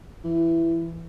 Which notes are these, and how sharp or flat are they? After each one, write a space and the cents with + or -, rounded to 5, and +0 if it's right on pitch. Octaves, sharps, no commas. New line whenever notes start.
E3 +10